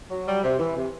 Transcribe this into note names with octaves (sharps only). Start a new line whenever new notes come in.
F#3
G3
C3
E3
C3